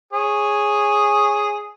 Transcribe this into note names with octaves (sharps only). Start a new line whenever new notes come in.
G#4 C#5